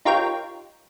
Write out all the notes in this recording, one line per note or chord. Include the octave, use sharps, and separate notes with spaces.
D#4 F4 G4 A#4 C#5 G5